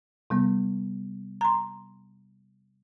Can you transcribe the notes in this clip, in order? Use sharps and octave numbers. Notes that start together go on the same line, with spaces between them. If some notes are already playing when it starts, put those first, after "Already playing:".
C3 G3 B3
A#5 C6